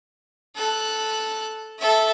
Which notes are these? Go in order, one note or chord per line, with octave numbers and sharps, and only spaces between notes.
A4 F#6
A4 E5